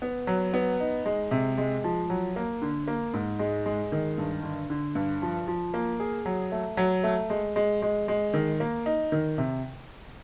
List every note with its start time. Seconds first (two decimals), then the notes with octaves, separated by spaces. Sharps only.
0.02 B3
0.27 F#3
0.53 B3
0.80 D#4
1.06 G#3
1.31 C3
1.58 G#3
1.84 F3
2.10 F#3
2.36 A#3
2.62 D3
2.88 A#3
3.14 G#2
3.39 G#3
3.66 G#3
3.92 D#3
4.18 G2
4.43 D3
4.70 D3
4.95 G2
5.22 F3
5.47 F3
5.74 A#3
6.00 G#4
6.26 F#3
6.52 A3
6.77 F#3
7.04 A3
7.30 G#3
7.56 G#3
7.82 G#3
8.08 G#3
8.34 D#3
8.60 A#3
8.86 D#4
9.12 D#3
9.38 C3